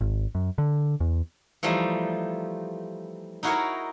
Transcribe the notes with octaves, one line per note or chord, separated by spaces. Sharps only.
G#1
F#2
D3
E2
E3 F3 G3 A3 D#4
D#4 E4 F#4 G#4 A#4 C#5